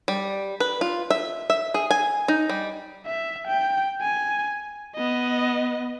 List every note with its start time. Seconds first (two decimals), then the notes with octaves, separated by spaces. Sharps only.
0.08 G3
0.60 B4
0.81 F4
1.10 E5
1.50 E5
1.74 G#4
1.91 G#5
2.28 D#4
2.49 G3
3.06 E5
3.47 G5
4.01 G#5
4.96 B3 D#5